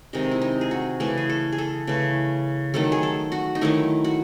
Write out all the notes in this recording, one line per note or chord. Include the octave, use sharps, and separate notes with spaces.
C3 D#3 G#3 D#4
E4
D#4
G#4
F#4
C#3 E3 A3 G#4
G#4
A4
G#4
A4
C#3 E3 A3
D#3 F#3 A3 A4
G#4
A4
F#4
D#4
D#3 F#3 A3 E4
F#4